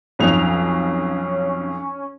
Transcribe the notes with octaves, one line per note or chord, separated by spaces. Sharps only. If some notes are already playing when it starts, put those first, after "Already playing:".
B1 F2 C#4 F7